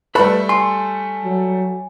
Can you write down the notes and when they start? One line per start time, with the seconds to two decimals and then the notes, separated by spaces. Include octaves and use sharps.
0.15 G3 A3 A4 B4 E5 B5
0.49 G#5 C6
1.25 F#3